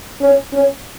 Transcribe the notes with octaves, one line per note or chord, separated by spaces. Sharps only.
C#4
C#4